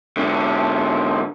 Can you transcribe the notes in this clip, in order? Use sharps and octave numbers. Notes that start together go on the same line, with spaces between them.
G#2 D3